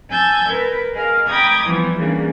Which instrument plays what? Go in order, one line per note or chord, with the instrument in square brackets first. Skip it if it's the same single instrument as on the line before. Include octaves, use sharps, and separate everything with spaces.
[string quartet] G#5 A5 E6 G6 G#6
A#4 B4
G#4 A#4 D#5 F5
G5 A#5 B5 D6 D#6 G#6
E3 F3 G3 B3
C#3 E3 G3 A#3 D4